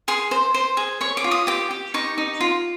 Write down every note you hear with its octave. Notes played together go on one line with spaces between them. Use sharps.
G#4 C6
C5
C5
G#4
C#5 C#6
D6
F4
D#6
G4 D6
G4
D#4 C#6
D#4
F4